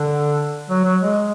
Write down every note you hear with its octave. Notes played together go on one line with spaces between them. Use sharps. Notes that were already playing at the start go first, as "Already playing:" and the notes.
Already playing: D3
F#3
F#3
G#3